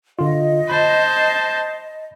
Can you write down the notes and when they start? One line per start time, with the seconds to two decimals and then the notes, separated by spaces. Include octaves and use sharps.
0.19 D3 F4 D#5
0.70 C5 A5 B5